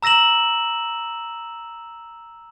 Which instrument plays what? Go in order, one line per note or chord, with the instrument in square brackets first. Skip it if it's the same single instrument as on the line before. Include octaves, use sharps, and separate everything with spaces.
[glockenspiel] A#5 E6 A#6 E7 F#7